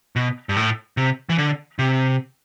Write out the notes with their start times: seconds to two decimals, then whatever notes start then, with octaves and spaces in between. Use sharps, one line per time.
0.16 B2
0.49 G2
0.56 A2
0.97 C3
1.29 E3
1.38 D3
1.79 C3